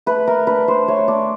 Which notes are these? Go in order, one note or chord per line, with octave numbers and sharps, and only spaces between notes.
A3 B4
A3 A#4
D4 B4
D4 C5
A3 C#5
D4 D5